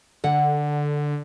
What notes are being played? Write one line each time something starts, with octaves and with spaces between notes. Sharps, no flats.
D3 F#5